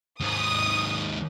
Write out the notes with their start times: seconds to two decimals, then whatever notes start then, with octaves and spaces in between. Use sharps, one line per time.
0.21 D#2 G#2 D#6